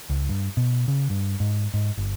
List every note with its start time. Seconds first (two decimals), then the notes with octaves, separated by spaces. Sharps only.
0.10 C#2
0.29 G2
0.57 B2
0.88 C#3
1.10 G2
1.40 G#2
1.74 G#2
1.97 G1